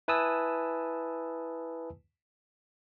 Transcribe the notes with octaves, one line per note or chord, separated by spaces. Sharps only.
E4 B4 G#5 A5 D#6 E6